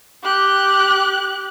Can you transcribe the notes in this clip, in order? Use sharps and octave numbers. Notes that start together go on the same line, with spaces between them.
G4 F#6